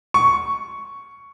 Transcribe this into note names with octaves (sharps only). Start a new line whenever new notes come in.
C#6